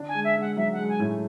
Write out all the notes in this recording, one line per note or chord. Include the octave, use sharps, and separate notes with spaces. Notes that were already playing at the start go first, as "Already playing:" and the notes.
Already playing: D3 D4
G#5
G#3
E5
G#3
F#5
F#3 E5
F#5
G#3
G#5
A2 A3